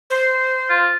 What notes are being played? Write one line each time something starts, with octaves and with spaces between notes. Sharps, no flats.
C5
F4